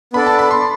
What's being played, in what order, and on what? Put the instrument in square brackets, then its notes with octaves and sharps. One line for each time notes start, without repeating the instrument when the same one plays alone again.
[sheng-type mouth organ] B3 D4 A4 D5 [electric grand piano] B5
[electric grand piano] A5
B5
C6